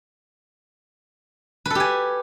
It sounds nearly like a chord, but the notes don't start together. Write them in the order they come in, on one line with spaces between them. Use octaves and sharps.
B4 A4 G4 G#5